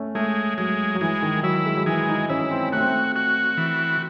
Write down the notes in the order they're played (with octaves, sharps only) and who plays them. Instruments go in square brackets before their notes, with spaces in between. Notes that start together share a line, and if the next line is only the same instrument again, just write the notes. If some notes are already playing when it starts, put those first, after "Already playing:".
Already playing: [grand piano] A3 C#4
[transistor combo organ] G#3 [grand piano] A3
[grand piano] F#3 [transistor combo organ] G#3
[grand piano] F#3
[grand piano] E3 [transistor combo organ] G#3
[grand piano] D#3
[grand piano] F#3 [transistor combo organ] E4
[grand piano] G#3
F#3
[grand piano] E3 [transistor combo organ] G#3
[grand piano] D#4
[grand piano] C#4 [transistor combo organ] E4
[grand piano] C4
[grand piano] A3 [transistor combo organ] F#4
[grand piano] C4
A3
[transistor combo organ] F#4
E3